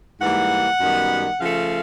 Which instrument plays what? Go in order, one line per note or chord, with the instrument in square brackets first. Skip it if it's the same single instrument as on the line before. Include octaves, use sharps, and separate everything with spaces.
[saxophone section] G#2 E3 G3 A#3 F#5
F#2 D#3 G3 B3
C#3 F3 A3 F5